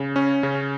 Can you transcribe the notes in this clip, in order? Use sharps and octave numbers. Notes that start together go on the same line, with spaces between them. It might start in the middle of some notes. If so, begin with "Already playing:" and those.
Already playing: C#3
C#4
C#3